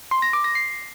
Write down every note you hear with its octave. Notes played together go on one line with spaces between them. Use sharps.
C6
A#6
D6
A#6
C7